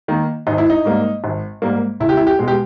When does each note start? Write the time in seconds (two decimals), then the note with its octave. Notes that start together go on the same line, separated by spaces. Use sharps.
0.08 D#3 A#3
0.47 G#1 D#4
0.58 E4
0.70 D#4
0.85 G#2 G3 A#3
1.24 G#1
1.62 G#2 G3 A#3
2.00 C#2 E4
2.09 G4
2.17 E4
2.27 G4
2.39 B2 G#3
2.48 G4